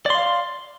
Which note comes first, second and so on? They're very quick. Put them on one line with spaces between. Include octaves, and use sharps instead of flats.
D5 C6 F5